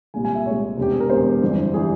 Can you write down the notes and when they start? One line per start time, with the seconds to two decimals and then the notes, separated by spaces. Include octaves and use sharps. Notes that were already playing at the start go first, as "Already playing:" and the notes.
0.14 C2 A#2 G#3 G#5
0.25 G#5
0.35 E5
0.45 C2 A#2 G#3 C#5
0.77 E1 E2 C3 G4
0.91 G#4
1.00 A#4
1.10 E1 E2 C3 C5
1.42 G1 F2 E3 G3
1.74 E3 G3 G#4